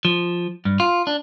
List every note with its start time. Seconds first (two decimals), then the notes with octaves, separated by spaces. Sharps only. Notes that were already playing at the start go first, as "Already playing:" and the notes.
0.05 F3
0.65 G2
0.80 F4
1.07 D4